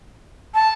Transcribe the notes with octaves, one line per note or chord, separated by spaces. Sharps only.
A5